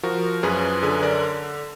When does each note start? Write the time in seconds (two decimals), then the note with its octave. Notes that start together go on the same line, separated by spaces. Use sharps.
0.03 F3 F#4 A#4
0.43 F#2 G#4 B4
0.83 D3 G#4 B4
1.03 A#4 D5